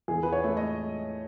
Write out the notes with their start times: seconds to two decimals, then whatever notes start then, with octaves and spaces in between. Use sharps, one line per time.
0.08 E2 G#4
0.23 B4
0.33 C#5
0.44 A3
0.57 D#5